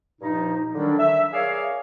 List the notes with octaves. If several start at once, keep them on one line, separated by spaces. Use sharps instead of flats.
G2 A#2 F3 D#4
D3 D#3 F#3 G3 D4
E5
G#4 A#4 C#5 D5 F5